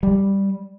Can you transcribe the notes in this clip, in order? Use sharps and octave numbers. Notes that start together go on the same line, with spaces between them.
G3